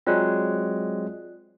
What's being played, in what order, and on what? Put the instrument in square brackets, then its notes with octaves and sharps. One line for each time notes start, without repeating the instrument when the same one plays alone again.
[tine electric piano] F#3 G#3 C4 [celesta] F4 D5 F#6